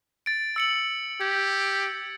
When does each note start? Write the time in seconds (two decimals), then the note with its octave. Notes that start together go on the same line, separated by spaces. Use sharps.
0.26 A6 D7
0.56 E6 C#7 F#7
1.21 G4 G#6